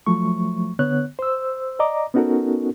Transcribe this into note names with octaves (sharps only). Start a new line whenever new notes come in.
F3 F#3 A3 C#6
D3 B3 C#5 F#6
C5 E6
D5 D#5 A#5 D6
B3 C#4 D#4 F#4 A4 A#4